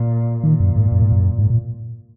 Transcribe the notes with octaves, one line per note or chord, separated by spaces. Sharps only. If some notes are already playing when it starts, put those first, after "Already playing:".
Already playing: A#2
A#2 D#3
F#2
G#2
F#2
G#2
F#2
G#2
A#2